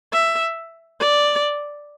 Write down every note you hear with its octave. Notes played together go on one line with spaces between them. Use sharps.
E5
D5